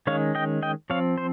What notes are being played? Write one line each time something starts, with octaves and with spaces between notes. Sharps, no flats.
D#3 G#3 C#4 C#5 F5
D#5 G5
D#5 G5
F3 C4 C#5 F5
C5